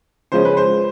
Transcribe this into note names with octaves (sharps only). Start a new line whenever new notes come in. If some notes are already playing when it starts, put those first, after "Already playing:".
C#3 F3 G#3 C#4 C5
B4
C5